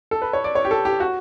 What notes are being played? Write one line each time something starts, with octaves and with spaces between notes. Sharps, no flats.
A4
B4
C#5
D5
C#5
G4
A4
G4
F#4